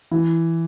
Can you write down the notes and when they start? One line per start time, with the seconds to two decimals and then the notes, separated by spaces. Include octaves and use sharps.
0.11 E3